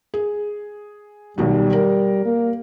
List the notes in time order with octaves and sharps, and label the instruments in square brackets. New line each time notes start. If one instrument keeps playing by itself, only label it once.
[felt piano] G#4
[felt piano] B1 B2 D#3 [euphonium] G3
[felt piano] A#4
[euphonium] A#3